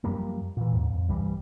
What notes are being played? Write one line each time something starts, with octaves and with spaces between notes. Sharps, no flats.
F#2 F3 G3 A#3
A#2 E3
D#2 G#2
F2
C2 G2 E3 G3